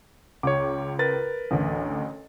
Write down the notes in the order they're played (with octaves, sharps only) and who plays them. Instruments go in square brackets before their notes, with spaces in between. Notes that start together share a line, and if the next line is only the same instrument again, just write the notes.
[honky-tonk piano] C#2 [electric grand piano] C#5 D6
[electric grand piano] A#4 B4 A6
[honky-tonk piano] A1 D2